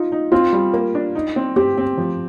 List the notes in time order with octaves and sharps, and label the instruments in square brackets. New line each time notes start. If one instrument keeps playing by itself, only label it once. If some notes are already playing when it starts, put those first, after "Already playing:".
Already playing: [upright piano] D#4 [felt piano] F4
[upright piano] D#4
[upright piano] C4 [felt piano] F4
[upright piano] G3
A#3
D4
D#4
C4
[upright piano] C4 [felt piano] G4
[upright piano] C4
F3